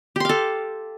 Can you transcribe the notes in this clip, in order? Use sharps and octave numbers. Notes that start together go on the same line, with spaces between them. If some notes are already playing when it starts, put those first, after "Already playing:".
G4 A4 F5 C6